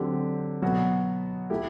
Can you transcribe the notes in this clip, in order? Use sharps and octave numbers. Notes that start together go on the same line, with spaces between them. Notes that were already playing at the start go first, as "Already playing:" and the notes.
Already playing: D3 F#3 C4 G4
B2 F#3 B3 F#4
A3 E4 G4